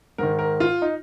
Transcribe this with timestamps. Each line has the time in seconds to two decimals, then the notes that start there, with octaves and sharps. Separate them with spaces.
0.18 G#2 D#3 A#4
0.39 A#4
0.60 F4
0.82 D#4